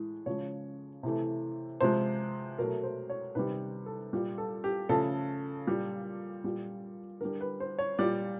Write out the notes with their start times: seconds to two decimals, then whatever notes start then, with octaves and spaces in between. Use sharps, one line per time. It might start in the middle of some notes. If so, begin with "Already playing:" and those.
Already playing: A2 E3 G#3
0.26 C#3 F3 G#3 C#5
1.03 C3 E3 A3
1.80 C3 F3 G#3 C5
2.58 B2 F#3 A3 A#4
2.83 C5
3.10 C#5
3.35 C3 D#3 G3 B4
3.86 A4
4.13 A#2 G3
4.38 A4
4.64 G4
4.89 C#3 F3 A3 A4
5.67 A#2 G3
6.44 A#2 G3
7.21 D3 G3 A#4
7.41 B4
7.60 C5
7.79 C#5
7.99 A#2 G3 D5